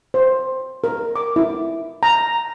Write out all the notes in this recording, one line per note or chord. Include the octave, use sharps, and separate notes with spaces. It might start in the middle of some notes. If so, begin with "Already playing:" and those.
C5
A#4
D6
E4
A#5